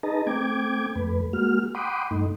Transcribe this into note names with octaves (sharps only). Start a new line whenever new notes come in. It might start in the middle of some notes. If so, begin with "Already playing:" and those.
D#4 G#4 B4 D#5 A5 A#5
A3 C4 G5 D6 G#6
F2 A3 B4
G#3 A#3 F#4 F6
F#5 G5 B5 C6 D6 D#6
G2 A3 D#4